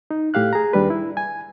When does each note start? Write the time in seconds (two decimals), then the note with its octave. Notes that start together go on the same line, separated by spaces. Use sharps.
0.11 D#4
0.34 A2 G4 F5 F#6
0.53 G#4 A#5
0.73 D#2 G3 D4 B4
0.90 E4
1.17 G#5